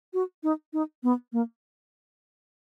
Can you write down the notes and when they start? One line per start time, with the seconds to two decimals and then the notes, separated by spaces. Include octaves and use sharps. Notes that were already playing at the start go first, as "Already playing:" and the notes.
0.14 F#4
0.43 D#4
0.73 D#4
1.03 B3
1.33 A#3